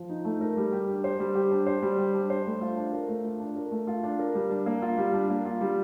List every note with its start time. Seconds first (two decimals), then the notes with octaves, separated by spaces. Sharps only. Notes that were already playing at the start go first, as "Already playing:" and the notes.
Already playing: F3
0.09 D#4
0.25 A3
0.41 A#4
0.57 G3
0.73 G4
0.87 D4
1.04 C5
1.20 G3
1.35 G4
1.51 D4
1.66 C5
1.83 G3
1.98 G4
2.14 D4
2.30 C5
2.46 A3
2.61 F4
2.77 D4
2.93 A#4
3.09 A3
3.24 F4
3.40 D4
3.56 A#4
3.71 A3
3.87 F4
4.04 D4
4.19 A#4
4.35 G3
4.51 D4
4.66 A#3
4.82 F4
4.98 G3
5.14 D4
5.30 A#3
5.45 F4
5.61 G3